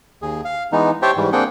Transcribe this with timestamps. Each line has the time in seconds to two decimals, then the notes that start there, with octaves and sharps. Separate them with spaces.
0.22 D#2 G#4
0.45 F5
0.72 E3 G#3 B3 D#4
1.02 G4 C5 C#5 E5 G5 A5
1.17 G#2 E3 G3
1.32 A#3 C4 D4 G#4 F#5 G5